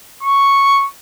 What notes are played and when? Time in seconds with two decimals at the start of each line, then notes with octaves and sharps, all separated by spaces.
0.23 C#6